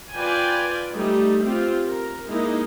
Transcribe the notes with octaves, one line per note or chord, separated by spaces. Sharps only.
F4 B4 D5 G5 G#5
G3 A3 D#4
C4 F4 G4
A#4
G#3 A#3 D#4 E4